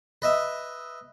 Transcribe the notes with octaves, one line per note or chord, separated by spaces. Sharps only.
B4 D#5 E5